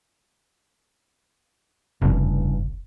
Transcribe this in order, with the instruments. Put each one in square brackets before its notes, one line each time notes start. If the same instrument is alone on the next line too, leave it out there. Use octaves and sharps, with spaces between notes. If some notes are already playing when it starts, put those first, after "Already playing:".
[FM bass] F1 [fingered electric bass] E2 G2 C#3